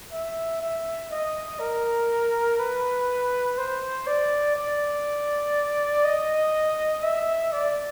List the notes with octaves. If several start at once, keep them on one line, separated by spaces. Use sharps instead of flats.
E5
E5
D#5
A#4
B4
C5
D5
D5
D#5
E5
D5